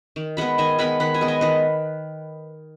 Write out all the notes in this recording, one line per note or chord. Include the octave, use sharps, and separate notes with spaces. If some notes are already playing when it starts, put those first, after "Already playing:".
D#3
G#3 B3 F#5 B5
D#3 D#5 G#5
G#3 B3 F#5 B5
D#3 F#5 B5
D#5 G#5
G#3 B3
D#5 G#5
D#3 B4 D#5